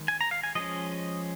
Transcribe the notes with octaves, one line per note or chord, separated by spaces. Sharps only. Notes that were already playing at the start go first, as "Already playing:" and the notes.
Already playing: D#3 G#3
G#5
A#5
F5
G#5
F3 G#3 C#4 D#5